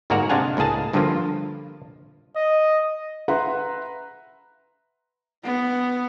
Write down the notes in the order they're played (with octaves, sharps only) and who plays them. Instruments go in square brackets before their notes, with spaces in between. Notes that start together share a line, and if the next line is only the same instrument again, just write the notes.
[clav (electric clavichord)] G1 G#2 A#3 F#4 D5 A#5
C3 G#3 D4 F5 F#5 G#5
C#2 A2 A#3 G#4 A5
G1 G2 D3 F3 A#3 F4
[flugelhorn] D#5
[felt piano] B4 E5 F#5 A#5 C6
[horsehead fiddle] B3